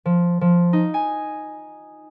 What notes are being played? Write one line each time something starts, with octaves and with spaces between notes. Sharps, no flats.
F3
F3
D#4
G#5